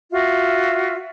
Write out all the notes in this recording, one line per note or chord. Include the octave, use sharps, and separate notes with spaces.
F4 F#4 E5